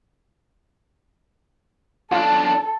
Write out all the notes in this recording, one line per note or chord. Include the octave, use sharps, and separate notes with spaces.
B1 D4 F4 A4